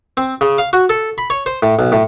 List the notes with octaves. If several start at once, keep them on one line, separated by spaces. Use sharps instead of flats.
C4
C#3
F5
F#4
A4
B5
C#5
C5
A2
B1
A2